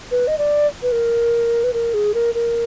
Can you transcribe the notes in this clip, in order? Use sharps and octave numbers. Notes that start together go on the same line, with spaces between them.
B4
D#5
D5
B4
A#4
B4
A#4
G#4
A#4
A#4